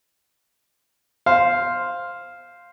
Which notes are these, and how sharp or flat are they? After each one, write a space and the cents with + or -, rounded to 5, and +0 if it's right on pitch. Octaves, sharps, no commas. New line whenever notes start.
C5 +0 F5 +0